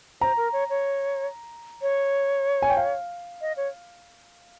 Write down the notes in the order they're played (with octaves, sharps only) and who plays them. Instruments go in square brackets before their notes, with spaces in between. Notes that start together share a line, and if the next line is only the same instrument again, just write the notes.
[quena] C5 [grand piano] A#5
[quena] A#4
C#5
C#5
C#5
[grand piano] G#5
G5
F5
[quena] D#5
C#5